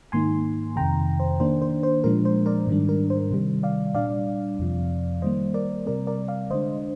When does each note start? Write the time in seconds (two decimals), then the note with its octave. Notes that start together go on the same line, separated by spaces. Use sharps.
0.12 G#2 D#3 A#3 D#4 G#5 C6
0.76 F2 C3 D#3 G5 A#5
1.20 C5
1.40 D#3 A#3 D4 C5
1.62 C5
1.83 C5
2.04 A#2 F3 G#3 D4 A#4
2.25 C5
2.46 A#4 D5
2.67 G#2 D#3 G3 D4
2.89 A#4
3.10 C5
3.31 C3 D#3 G3
3.63 D5 F5
3.95 A#2 G3 D4 D5 F5
4.59 F2 C3 F3
5.22 D#3 G3 A#3 C5 D#5
5.54 A#4 D5
5.86 C3 G3 C4 A#4 D5
6.07 A#4 D5
6.28 D5 F5
6.50 D3 G#3 D4 C5 D#5